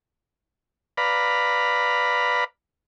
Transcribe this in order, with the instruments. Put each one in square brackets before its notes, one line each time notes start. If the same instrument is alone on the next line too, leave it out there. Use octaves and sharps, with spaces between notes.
[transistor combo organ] B4 D5 F5 A#5 B5